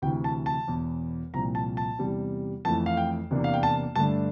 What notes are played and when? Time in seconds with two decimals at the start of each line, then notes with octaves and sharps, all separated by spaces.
0.02 D2 C3 E3 G5
0.24 A5
0.46 A5
0.68 E1 E2 E3
1.34 C2 A#2 F3 C4 A#5
1.55 A5
1.77 A5
1.99 E2 C3 G3
2.65 F2 E3 A3 A5
2.86 F5
2.97 G5
3.31 E2 C3 E3 A#3 D4
3.44 F5
3.54 G5
3.63 A5
3.96 G2 D3 A3 D4 A5